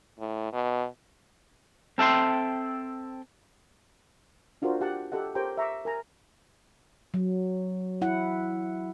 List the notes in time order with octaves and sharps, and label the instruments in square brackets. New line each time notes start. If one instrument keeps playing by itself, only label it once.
[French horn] A2
B2
[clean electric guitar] C4 A4 E5 G5 C6
[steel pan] D4 F4 F#4 A#4 C5
G4 F#5 A5
G4 A4 D#5 F#5
G4 A#4 C5 C#5 G5 A#5
E5 A#5 C#6 D6
A#4 G#5 A#5
[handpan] F#3
E4 F#5